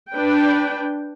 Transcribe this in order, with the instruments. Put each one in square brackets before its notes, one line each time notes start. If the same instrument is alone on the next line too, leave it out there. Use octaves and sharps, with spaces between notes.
[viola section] D4 B4 G5